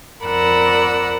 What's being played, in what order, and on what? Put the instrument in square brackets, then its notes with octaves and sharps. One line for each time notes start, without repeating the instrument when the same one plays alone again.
[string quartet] F2 A#4 D5 F#5 B5 E6